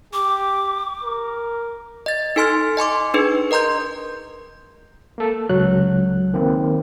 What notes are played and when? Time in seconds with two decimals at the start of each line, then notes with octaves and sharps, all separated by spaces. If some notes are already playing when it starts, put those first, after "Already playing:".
0.13 G4 D6
1.03 A#4
2.06 D#5 A6
2.36 D#4 A4 G#5 C6 F6 A6
2.77 D#5 G#5 C6 D6
3.14 D4 D#4 G#4 B4
3.51 A#4 D#5 A#5 C6 G6
5.18 A#3 A4
5.50 C#2 F#3 F#6
6.34 D#3 A#3 C4